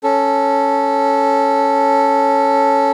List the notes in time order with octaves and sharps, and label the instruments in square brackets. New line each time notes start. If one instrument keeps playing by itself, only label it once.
[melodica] C#4 A4